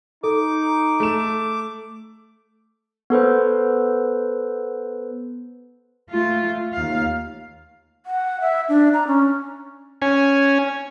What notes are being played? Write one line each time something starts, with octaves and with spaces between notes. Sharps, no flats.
D#4 A4 D6
A3 E7
B3 A4 B4 C5
A3 F4
D#2 F5
F#5
E5
D4
A#5
C#4
C#4 G#5